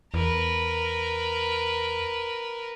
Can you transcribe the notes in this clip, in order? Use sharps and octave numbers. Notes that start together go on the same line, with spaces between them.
E2 A#4 B4